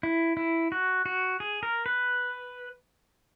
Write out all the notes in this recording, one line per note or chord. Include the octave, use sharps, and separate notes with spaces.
E4
E4
F#4
F#4
G#4
A#4
B4